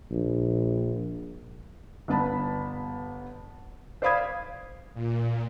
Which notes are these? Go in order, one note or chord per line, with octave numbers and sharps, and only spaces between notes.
A#1
G1 B3 A5 B5
C5 D5 F5 B5 D#6 G#6
A#2